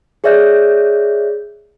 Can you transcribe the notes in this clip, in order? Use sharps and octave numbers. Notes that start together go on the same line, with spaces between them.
G#4 C#5 D5 E5 F#6 G6